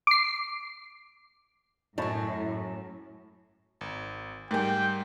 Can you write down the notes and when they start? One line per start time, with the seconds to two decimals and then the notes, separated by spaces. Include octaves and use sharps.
0.07 D6 C7
1.98 F#2 A2 F#3 A5 B5 C#6
3.81 G#1
4.51 G#2 G3 A3 A#4 G5 G#5